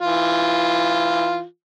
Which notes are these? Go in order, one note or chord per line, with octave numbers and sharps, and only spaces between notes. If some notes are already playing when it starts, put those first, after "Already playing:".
E3 F4